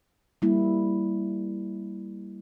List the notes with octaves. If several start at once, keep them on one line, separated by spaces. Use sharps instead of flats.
G3 A#3 E4